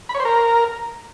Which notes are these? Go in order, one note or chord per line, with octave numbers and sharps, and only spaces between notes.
B5
C#5
C5
A#4